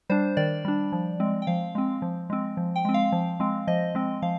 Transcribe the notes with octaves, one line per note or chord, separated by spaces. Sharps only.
G3 D4 C5
D#3 D5
G3 D4
F3
G#3 C4
G5
F3 F5
G#3 C4
F3
G#3 C4
F3
G5
G#3 C4
F5
F3
G#3 C4
F3 D#5
G#3 C4
F3 F5